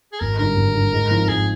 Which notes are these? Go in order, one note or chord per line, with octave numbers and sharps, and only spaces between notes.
G#4
G#1 A#4
G2 D3 A#4
G#1
G2 D3
G#2
F3 C4 D#4
G#2 G#4